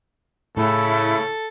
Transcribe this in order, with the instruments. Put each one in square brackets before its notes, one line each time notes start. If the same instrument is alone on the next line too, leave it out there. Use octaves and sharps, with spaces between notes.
[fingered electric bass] A2 A3 [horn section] C#3 [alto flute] E4 [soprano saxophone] A4